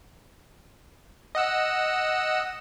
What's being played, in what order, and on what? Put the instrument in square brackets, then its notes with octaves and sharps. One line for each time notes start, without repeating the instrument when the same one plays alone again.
[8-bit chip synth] D#5 F#5 E6